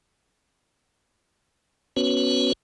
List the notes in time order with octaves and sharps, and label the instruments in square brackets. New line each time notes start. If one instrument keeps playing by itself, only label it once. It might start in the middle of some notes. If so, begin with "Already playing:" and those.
[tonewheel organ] B3 C#4 F#4 B4 C#5